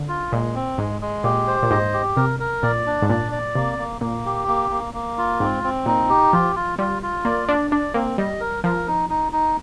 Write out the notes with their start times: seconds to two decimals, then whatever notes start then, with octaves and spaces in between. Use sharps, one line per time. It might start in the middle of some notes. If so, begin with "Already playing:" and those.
Already playing: D3
0.08 F4
0.31 A#2 G#3
0.55 C4
0.78 G#2 G#3
1.01 G#3
1.24 A#2 G4
1.47 C5
1.63 A#2
1.71 G#2 D#5
1.93 G4
2.17 C3 A#4
2.40 A#4
2.63 A#2 D5
2.87 D4
3.02 G#2
3.09 A#2 D5
3.32 D5
3.55 C3 A#3
3.78 A#3
4.01 A#2 A#3
4.25 G4
4.48 A#3
4.71 A#3
4.94 A#3
5.18 F4
5.40 G#2 C4
5.64 C4
5.86 A#2 D#4
6.09 G4
6.33 F3 F4
6.56 F4
6.79 G3 F4
7.03 F4
7.25 A#3 D5
7.49 D4 D5
7.71 D4 D5
7.94 A#3 C4
8.18 G3 D#5
8.40 A#4
8.64 F3 A#4
8.87 D#4
9.10 D#4
9.32 D#4